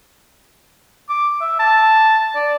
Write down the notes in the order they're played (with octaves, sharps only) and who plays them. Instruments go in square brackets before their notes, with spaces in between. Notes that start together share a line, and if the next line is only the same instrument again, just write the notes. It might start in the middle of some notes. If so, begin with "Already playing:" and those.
[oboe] D6
E5
A5
D5